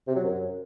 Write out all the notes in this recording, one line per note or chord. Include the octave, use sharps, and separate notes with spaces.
C3
F#3
F#2